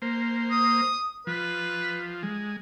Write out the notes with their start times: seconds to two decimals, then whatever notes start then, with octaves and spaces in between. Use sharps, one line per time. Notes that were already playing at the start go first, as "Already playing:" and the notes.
0.02 A#3 C5
0.51 D#6
1.27 F3 B4
2.23 G#3